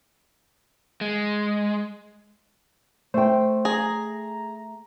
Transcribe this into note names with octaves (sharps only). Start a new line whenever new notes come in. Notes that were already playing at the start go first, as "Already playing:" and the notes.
G#3
A3 C5 G5
G#4 A#5